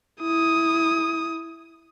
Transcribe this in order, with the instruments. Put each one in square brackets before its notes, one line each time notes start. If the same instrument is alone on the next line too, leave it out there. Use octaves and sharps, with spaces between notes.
[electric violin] E4 D#6